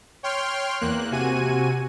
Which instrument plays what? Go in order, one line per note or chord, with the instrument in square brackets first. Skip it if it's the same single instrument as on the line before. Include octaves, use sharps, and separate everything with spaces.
[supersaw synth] C#5 G5 C6 F6
E2 A#3 F#6
C3 F#4 G#5 D#7